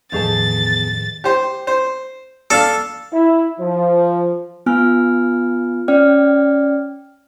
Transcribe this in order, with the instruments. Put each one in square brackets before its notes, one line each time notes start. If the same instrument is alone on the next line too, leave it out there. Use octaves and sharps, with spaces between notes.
[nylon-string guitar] E2 G#4 A5 [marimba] A2 D#3 F3 [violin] A6
[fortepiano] G4 C5
C5
[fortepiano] D4 F5 [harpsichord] A4
[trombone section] E4
F3
[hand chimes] B3 F4 G#5 F6
C#4 D5 G5 F6